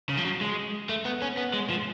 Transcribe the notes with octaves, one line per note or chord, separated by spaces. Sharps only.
C#3
F3
F#3
G#3
A3
B3
C#4
B3
G#3
F3